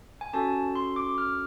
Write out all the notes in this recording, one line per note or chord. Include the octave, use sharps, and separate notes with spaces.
G#5
C#4 F#4 A4 A5
C6
D6
F6